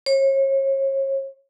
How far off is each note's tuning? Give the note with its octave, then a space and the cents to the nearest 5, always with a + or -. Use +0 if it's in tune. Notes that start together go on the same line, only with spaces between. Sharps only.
C#5 -35